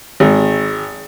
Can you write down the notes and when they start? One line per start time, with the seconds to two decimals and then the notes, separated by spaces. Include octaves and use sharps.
0.20 G#1